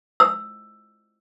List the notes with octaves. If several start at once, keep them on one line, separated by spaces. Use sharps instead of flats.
E6